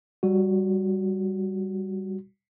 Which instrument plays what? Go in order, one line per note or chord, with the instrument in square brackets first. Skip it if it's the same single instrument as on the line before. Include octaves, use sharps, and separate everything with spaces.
[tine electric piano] G3 F#4